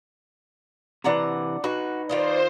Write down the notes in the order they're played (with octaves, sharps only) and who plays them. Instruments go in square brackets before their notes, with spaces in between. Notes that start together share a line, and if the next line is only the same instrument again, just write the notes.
[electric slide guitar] C3 E3 B4 [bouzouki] D4 F#5 A#5
[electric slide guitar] D#4 B4 [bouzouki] F#4
[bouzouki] D#3 F4 D#5 [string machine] C5 [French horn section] D5